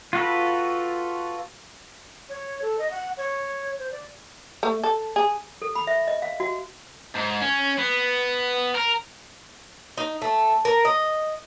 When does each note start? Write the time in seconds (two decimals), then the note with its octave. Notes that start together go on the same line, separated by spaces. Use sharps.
0.13 F4 F#4 A4 B4
2.29 C#5
2.62 A4
2.79 D#5
2.91 F#5
3.17 C#5
3.79 C5
3.92 D5
4.63 A3
4.84 A4
5.16 G#4
5.62 A4
5.75 B5
5.87 E5
6.08 D#5
6.22 F5
6.40 F#4
7.15 G#2
7.41 C#4
7.78 B3
8.75 A#4
9.98 D#4
10.22 A3
10.65 A#4
10.85 D#5